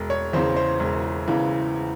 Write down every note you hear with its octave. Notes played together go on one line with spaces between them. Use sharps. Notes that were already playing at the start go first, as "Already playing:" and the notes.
Already playing: E1
C#5
E2 C#3 E3 C5
C5
E1
E2 C#3 E3